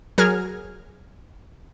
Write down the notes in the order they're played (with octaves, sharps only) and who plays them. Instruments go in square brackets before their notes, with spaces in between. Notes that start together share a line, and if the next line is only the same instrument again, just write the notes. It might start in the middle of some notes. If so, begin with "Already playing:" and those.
[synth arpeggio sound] F#3 G#4 A#4 F6 G#6